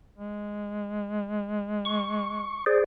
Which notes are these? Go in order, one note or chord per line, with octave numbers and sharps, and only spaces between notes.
G#3
C#6
G#4 C5 D5